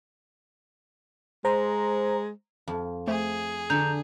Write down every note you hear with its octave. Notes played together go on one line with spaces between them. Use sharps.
G#3 C5 A#5
F2
A3 G#4 C5
D3 A#5 G6 F7